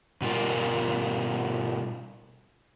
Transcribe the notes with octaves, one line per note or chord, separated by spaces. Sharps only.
B2 G3 F4 A#4